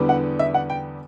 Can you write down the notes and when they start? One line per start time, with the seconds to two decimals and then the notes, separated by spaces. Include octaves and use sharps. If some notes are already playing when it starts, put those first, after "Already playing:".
Already playing: E2 D3 G3 B3 D4
0.09 F#5
0.39 E5
0.54 F#5
0.70 G5